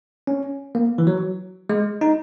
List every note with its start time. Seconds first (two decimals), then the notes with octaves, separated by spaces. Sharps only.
0.27 C#4
0.75 A#3
0.98 E3
1.07 F#3
1.69 G#3
2.01 D#4